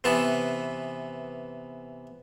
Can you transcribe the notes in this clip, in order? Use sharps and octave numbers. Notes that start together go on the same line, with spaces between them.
C3 E3 B3 A5